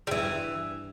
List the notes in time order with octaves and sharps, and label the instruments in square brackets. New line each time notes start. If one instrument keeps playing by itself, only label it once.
[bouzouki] G3
[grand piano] G2 [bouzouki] E3